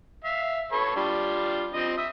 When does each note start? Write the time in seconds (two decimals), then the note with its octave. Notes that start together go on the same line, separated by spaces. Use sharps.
0.24 E5 F5
0.72 A4 B4 C#5
0.96 G3 D4 F4
1.74 F3 C4 D#5
1.98 E5 D#6